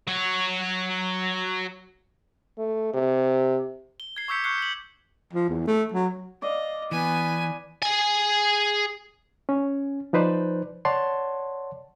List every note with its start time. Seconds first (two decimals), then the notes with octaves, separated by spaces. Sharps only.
0.07 F#3 C#5
2.58 A3
2.94 C3
4.00 G7
4.16 G#6 C7
4.28 C#6 D6 E6 G6 B6 C#7
4.44 C#6 F#6 G6 C7 C#7 G7
4.58 B6 F#7
5.33 F3
5.49 E2
5.67 A3
5.94 F#3
6.42 D5 D#5 F5
6.91 E3 B3 G#5 B5
7.82 G#4 G#5
9.49 C#4
10.13 F3 D#4 B4 C5 D5
10.85 C#5 D5 F#5 A5 C6